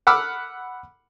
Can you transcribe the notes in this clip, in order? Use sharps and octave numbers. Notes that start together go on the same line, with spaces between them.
F#5 B5 D6 E6 F6